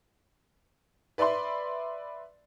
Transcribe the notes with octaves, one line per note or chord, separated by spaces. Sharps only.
B4 D5 E5 B5 C6